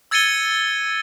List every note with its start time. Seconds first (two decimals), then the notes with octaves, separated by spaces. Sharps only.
0.11 E6 G#6 A6 C#7 D#7 G7